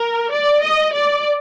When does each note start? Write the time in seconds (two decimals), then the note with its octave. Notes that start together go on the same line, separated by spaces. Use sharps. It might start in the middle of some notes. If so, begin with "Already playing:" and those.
Already playing: A#4
0.32 D5
0.64 D#5
0.93 D5